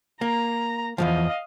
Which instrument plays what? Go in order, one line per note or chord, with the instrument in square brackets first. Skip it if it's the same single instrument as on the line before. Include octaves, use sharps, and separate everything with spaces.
[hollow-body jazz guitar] A#3 [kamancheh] A#5
[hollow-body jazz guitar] E2 G#2 F3 [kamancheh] D#5 F5